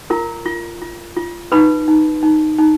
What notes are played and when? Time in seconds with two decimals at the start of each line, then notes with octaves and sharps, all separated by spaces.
0.10 F4 A#4 A#5
0.46 F4
0.82 F4
1.17 F4
1.52 D#4 B4 B5
1.88 D#4
2.23 D#4
2.58 D#4